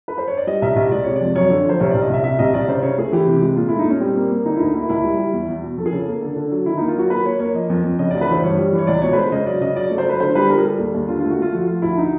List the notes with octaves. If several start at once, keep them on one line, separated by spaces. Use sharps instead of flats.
B4
C5
C#5
D5
G3 D#5
C2 E5
C2 D#5
G#3 D5
C3 C#5
D5
F2
F#2 C#5
D3
F3 C5
C2 C#5
D5
C2
D#5
C2 E5
C3 E5
C2 D#5
C2 D5
C#3 C5
C#3 C#5
A3 G#4
E3 G4
C3
G#3
A#2 F4
E4
A3
D#4
A#2 C#4
G3 C4
A#3
A#3
D3 D#4
E4
D2 D#4
A#3 E4
C#2 E4
G3
G3
E2
E2
B2
F2 A4
G#4
C#3 A4
A#3
D3 A4
D3
F#3
D#3 E4
D#4
A#3
F4
F#3 F#4
A#3 B4
A#3 C#5
A#3 C#5
F3 D#5
F2
F2
C#3 D#5
D5
D2
B4
E3 C5
G2 C#5
G3
E3
C#5
C#2 D5
B2 C#5
B4
G#3 C5
C#3 D#5
F#3 D5
C#3 D#5
F#3 D5
C#5
A3
C5
F#3 B4
D3 C5
G3 B4
G3 A#4
G#4
G3 A4
D#2
D#2
D3 F4
F4
A3
F#4
A3 F4
F3 F#4
F3 F4
D2 E4
D#4